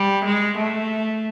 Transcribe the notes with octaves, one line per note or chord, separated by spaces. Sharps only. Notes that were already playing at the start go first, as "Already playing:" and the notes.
Already playing: G3
G#3
A3